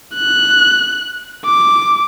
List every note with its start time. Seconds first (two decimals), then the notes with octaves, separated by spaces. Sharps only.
0.15 F#6
1.45 D6